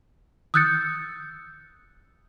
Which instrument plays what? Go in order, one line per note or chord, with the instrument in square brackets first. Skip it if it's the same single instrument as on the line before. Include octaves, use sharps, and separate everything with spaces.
[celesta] D#6 E6 F#6 G6 A6 C#7